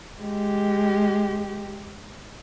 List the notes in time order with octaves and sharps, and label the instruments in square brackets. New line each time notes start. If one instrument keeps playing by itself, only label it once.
[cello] G#3 G4